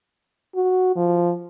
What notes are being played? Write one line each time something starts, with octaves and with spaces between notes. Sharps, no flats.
F#4
F3